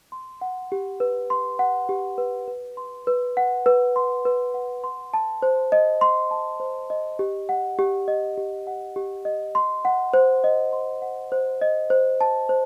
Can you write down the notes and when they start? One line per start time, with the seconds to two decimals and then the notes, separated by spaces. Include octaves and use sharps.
0.12 C6
0.41 F#5
0.72 G4
1.00 B4
1.30 C6
1.59 F#5
1.89 G4
2.18 B4
2.48 B4
2.77 C6
3.07 B4
3.37 F#5
3.66 B4
3.96 C6
4.25 B4
4.54 F#5
4.84 C6
5.14 A5
5.42 C5
5.72 D#5
6.01 C6
6.31 A5
6.60 C5
6.90 D#5
7.19 G4
7.49 F#5
7.79 G4
8.08 D#5
8.38 G4
8.67 F#5
8.96 G4
9.25 D#5
9.55 C6
9.85 F#5
10.14 C5
10.44 D#5
10.73 C6
11.02 F#5
11.32 C5
11.61 D#5
11.90 C5
12.21 A5
12.49 C5